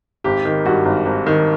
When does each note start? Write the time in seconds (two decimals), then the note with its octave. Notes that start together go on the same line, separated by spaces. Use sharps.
0.24 G#1 G4
0.45 D#3
0.65 G2 F#4
0.85 G#1
1.06 G#1
1.26 D#3